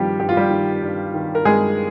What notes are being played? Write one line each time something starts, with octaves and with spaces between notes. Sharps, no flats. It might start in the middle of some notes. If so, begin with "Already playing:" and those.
Already playing: G2 D#3 F3 G3 F4 G4
G2 G4
F4
G3 G4
D#3
G2
D#3
A#4
G2 G#3 G#4